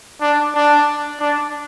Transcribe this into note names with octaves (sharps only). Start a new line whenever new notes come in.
D4
D4
D4